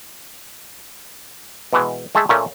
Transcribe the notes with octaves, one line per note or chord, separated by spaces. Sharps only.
B2 E3 G#3
G#3 A3 G#4 A4 E5
A#2 A3 A#3 C#4